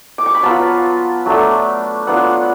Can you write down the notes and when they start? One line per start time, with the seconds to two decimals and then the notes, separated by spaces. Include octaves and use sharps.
0.18 D6
0.26 C#6
0.35 B5
0.43 F#3 B3 F4 A5
1.26 F#3 A3 D4
2.07 F#3 B3 D4 F4 F#5